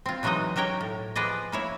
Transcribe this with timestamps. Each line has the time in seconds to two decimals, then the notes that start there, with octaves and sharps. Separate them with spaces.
0.06 C4 F4
0.23 B2 E3 F#3 G#3 D#4 D#5
0.56 F#3 G4 A#4 C#5 G5
0.81 A2
1.16 F3 B3 G#4 D5 D#5
1.52 A#3 E4 C#5